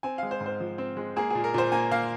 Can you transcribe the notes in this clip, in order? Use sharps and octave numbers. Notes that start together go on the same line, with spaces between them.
C4 G#5
G#3 F5
C5
G#2
C5
F3
C4
G#3
A#3 G#4
A#2 G#4
A#4
A#2 C5
A#3 G#5
A#3 F5